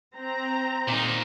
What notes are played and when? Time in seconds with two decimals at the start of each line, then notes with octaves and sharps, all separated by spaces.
0.16 C4 A#5
0.88 A#2 D#4